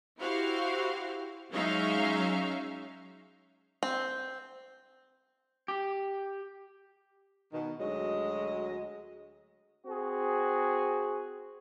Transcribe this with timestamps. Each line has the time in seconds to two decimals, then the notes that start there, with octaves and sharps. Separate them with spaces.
0.19 E4 F#4 G4 C5 F5
1.52 F#3 G#3 C#4 D#4 E5 F5
3.83 C4
5.68 G4
7.53 B2 D#3
7.80 D2 F#3 G#3 D#5
9.85 C4 F#4 G#4